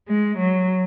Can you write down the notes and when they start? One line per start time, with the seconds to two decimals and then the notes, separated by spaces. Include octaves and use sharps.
0.09 G#3
0.38 F#3